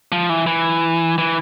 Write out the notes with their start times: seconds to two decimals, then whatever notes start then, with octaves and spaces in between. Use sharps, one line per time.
0.12 F3
0.30 E3
0.47 E3
1.18 E3